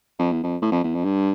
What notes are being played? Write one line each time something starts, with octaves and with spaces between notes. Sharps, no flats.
F2
E2
F2
A2
F2
E2
F2
G2